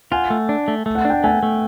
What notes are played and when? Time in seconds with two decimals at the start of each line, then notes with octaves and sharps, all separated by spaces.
0.11 F4 F#5 G#5
0.30 A3
0.49 D4
0.68 A3
0.86 A3
0.95 F#5
1.05 D4
1.10 G5
1.24 A3 F#5 G#5
1.43 A3